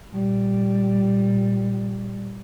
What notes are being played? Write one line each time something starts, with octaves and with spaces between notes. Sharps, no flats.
A#2 G3